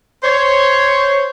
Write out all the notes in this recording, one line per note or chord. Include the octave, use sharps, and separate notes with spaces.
C5 C#5